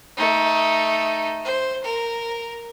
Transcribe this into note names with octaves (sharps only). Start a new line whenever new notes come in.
A3 D#4
C5
A#4